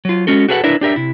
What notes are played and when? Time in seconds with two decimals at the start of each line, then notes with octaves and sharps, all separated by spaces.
0.05 F#3 F4
0.27 G#3 C#4 F#4 A4
0.48 F#4 G#4 A4 B4 F5 F#5
0.64 D4 E4 A#4 B4 E5
0.81 D4 G4 A#4 E5
0.96 C3 E4